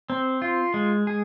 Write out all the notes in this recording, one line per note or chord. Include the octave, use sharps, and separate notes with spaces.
C4
F4
G#3
G#4